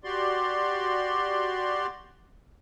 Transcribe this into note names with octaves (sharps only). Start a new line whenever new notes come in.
F#4 G4 D5 C6